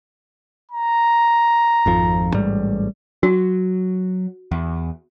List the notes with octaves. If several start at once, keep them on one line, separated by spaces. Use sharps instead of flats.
A#5
G#1 F2 F3
A1 G#2 G3
F#3 F#4
E2